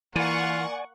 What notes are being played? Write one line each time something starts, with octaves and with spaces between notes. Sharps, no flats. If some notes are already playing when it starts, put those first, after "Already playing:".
E3 A#3 F4 D5 F#5 G#5 C#6